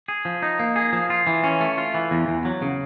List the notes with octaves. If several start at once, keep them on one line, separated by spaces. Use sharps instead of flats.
G#4
F3
D#4
A#3
G#4
F3
F4
E3
C#4
A3
F4
E3
E2
E2
F#3
C#3